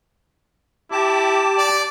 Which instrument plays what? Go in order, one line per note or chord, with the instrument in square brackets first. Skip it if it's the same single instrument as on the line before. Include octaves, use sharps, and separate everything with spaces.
[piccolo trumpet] E4 [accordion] G4 A5 D6
[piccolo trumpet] D5